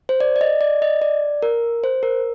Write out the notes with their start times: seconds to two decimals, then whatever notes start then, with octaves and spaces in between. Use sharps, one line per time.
0.09 C5
0.20 D5
0.36 D5
0.41 D#5
0.61 D5
0.82 D#5
1.02 D5
1.43 A#4
1.84 C5
2.03 A#4